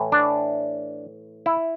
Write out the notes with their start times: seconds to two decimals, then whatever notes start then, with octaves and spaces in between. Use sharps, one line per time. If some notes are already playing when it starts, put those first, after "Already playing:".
Already playing: A2 E3
0.12 D4
1.46 E4